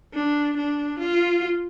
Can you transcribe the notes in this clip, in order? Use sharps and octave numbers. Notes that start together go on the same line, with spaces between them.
D4
D4
F4